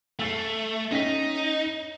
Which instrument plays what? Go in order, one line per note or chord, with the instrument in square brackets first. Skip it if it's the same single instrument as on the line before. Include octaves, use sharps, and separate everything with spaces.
[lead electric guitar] A3 [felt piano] E6 A6 C7
[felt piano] C#4 G5 B6 [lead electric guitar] D#4